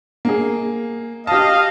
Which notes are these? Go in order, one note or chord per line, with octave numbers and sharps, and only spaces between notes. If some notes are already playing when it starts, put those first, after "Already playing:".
A#3 G#4
G4 D#5 F5 A5